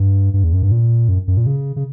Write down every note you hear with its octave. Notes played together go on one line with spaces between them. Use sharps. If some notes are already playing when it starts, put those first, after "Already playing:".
Already playing: G2
G2
E2
F#2
G2
A#2
F#2
F#2
A#2
C#3
C#3